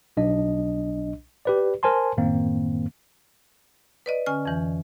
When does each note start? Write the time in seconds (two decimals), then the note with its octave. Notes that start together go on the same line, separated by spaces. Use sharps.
0.17 B1 D4 D#5
1.45 G4 B4 D5
1.83 A#4 C5 G#5 A5 C6
2.17 F#2 A2 D#3 A#3 C4
4.06 B4 D5 D#5
4.26 D3 C#4 G#5 F6
4.45 F2 E3